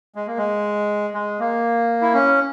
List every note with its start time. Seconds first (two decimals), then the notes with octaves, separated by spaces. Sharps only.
0.15 G#3
0.27 A#3
0.37 G#3
1.14 G#3
1.40 A#3
2.01 E4
2.14 C#4